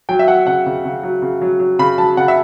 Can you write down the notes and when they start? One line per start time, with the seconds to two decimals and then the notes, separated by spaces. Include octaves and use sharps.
0.09 F#3 G5
0.19 E5
0.28 F#3 F#5
0.47 C#3 F#5
0.66 C#3
0.85 C#3
1.03 F#3
1.22 C#3
1.42 F#3
1.60 F#3
1.79 C#3 B5
1.98 F#3 A5
2.17 C#3 F#5
2.28 E5